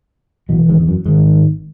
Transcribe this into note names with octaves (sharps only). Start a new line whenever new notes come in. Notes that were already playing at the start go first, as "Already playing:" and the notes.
B1 B2 E3
G#1 G#2
E2
F#2
G#1 G#2 D#3